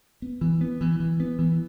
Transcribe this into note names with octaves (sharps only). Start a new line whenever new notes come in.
B3
E3
B3
E3
E3
B3
E3